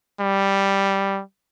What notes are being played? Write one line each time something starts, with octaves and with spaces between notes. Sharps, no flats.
G3